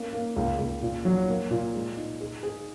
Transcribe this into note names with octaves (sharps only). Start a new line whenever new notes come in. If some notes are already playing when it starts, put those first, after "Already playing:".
Already playing: A#3 C#4
A#3
C#2
C#2
A#2
F#3
A#3
A#2
G#3
D#4
G#4
G#4